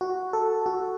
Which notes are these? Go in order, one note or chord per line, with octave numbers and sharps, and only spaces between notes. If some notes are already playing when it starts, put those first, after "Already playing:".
F#4
A4
F#4